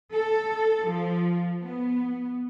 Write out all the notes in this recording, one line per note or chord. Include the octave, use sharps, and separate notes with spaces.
A4
F3
B3